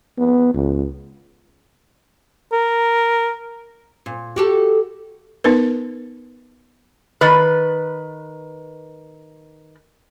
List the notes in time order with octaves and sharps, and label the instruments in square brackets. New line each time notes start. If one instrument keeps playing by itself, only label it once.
[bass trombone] B3
C#2
[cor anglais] A#4
[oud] A#2
F#4 G4 A4
[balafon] B3 D#4 A#4 B4
[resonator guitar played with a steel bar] D#3 B4